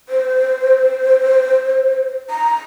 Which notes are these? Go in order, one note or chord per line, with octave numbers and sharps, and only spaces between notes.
C5
A#5